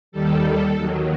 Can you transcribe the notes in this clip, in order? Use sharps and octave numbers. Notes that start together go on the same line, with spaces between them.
D#2 D#3 G3 A4
D#2 D#3 F#3